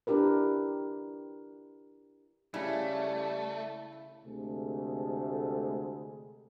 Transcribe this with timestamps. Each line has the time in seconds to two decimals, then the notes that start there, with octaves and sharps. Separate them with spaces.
0.07 D4 E4 G4 A#4 B4
2.54 C#3 G3 A3 E4
4.23 D2 C3 G#3 A3 G#4